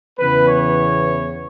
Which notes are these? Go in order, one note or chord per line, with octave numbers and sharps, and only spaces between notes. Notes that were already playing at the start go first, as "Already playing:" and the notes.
E2 C#3 E3 B3 B4
C#5